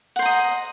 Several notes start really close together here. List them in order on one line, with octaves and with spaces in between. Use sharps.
F#5 C5 A#5 D#5